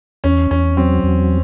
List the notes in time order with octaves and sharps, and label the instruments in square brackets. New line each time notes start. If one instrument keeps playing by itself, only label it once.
[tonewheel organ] E2 [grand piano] C#4
[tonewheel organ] E2 [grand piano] C#4
[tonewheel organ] F#3 [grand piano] C4
[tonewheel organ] E2